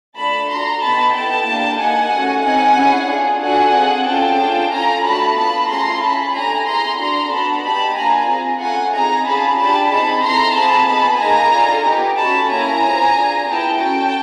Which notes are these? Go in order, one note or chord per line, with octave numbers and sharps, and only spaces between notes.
A3 D4 F4 A4 A5 B5
D4 F#4 A4 A#5 C6
B3 D#4 G4 A5 B5
B3 E4 A4 G5 A5
A#3 D4 G4
A#3 D#4 G4 F#5 G#5
A3 C#4 F#4 A4
C4 D#4 F#4 F#5 G#5
C#4 E4 G#4
D4 F4 G#4
D4 F#4 A4 F#5 G#5
C4 F4 G#4
C#4 F4 A4 G5 A5
A3 D4 F4 G#4
C#4 F4 A4 G#5 A#5
A3 D4 F#4 A4 A5 B5
B3 D4 F4 A5 B5
A3 C#4 F4 G#4 A#5 C6
C#4 E4 A4 A5 B5
A3 D4 G4 G#5 A#5
B3 E4 G#4 A#5 C6
D4 F#4 A4 A#5 C6
B3 D4 F#4 A5 B5
B3 D#4 G4 A5 B5
A#3 D4 F4 G#5 A#5
C4 F4 G#4
A3 C#4 F4 F#5 G#5
C4 D#4 G#4 G#5 A#5
C#4 F4 G#4 A5 B5
D4 G4 A5 B5
C4 D#4 G#4 A5 B5
C4 E4 A4 A#5 C6
C4 F4 G#4 A5 B5
B3 D#4 G#4 A5 B5
A#3 D#4 G#4 G#5 A#5
D4 F4 A4
B3 D#4 G4
A3 C#4 F#4 A5 B5
A#3 C#4 E4 G#5 A#5
C4 F4 G#4
D4 F4 G#4
B3 E4 G#4 G5 A5
C#4 F#4 A4 G5 A5